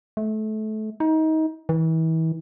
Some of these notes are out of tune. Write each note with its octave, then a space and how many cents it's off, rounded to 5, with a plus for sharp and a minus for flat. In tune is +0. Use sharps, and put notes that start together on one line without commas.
A3 -25
D#4 +25
E3 -35